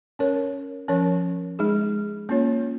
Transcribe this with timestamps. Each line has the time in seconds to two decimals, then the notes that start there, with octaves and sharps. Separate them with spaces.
0.19 C#4 A#4 C#5
0.88 F3 C#4 A#4 C#5
1.59 G#3 D#4 G#4
2.29 A#3 C#4 F4 C#5